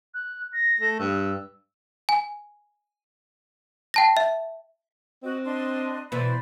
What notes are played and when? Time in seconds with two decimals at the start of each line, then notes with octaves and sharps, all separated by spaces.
0.14 F#6
0.53 A#6
0.80 A3
1.00 G2 E6
2.09 G#5
3.94 G5 A5 A#6
4.17 E5
5.23 C4 F#4 D#5
5.44 D4 D#5 C6
6.12 B2 E3 C5 D5 B5